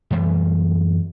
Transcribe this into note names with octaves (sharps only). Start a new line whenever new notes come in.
F#2 E3 G3 A3